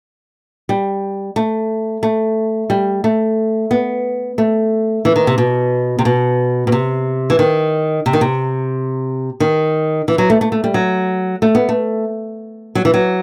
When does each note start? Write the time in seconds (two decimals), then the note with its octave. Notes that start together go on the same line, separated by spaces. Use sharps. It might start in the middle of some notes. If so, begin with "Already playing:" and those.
0.69 G3
1.36 A3
2.03 A3
2.70 G3
3.04 A3
3.71 B3
4.38 A3
5.05 E3
5.16 D#3
5.27 C3
5.38 B2
5.99 C3
6.05 B2
6.67 B2
6.72 C3
7.30 E3
7.39 D#3
8.06 C3
8.13 D#3
8.21 C3
9.40 D#3
10.08 E3
10.18 F#3
10.30 A3
10.41 A3
10.52 A3
10.64 G3
10.74 F#3
11.42 A3
11.55 B3
11.69 A3
12.75 F#3
12.85 E3
12.94 F#3